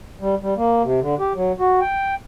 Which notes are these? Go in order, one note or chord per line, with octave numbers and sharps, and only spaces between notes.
G3
G3
A#3
C3
D3
G4
F#3
F#4
G5